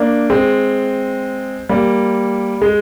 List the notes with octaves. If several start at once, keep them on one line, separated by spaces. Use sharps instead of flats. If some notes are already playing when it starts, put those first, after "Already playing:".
Already playing: A#3 D4
G#3 C4
G3 A#3
G#3